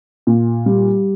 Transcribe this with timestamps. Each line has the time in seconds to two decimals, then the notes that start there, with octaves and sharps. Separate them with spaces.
0.27 A#2
0.66 G3